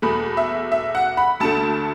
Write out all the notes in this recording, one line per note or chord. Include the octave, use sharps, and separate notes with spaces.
E2 B2 A3 B5
E5
E5
F#5
B5
D2 D3 A3 A5